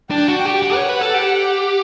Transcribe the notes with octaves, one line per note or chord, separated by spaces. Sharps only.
D4 G5
F#4
G4
G4 F#5
C#5
B4
A4
G4